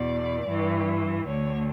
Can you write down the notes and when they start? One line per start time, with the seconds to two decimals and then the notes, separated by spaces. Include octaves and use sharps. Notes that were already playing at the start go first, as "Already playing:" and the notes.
Already playing: E2 B2 D5
0.47 G2 E3
1.26 D2 D3 C#5